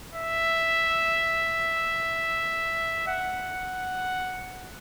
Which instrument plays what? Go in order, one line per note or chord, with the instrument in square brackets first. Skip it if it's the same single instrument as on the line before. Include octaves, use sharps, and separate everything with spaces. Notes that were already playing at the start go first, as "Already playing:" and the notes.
[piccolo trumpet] E5
F#5